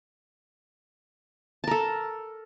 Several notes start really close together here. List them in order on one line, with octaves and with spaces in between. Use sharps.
A5 A#4 A4